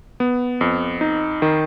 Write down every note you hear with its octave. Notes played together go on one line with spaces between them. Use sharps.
B3
F2
D#4
D#3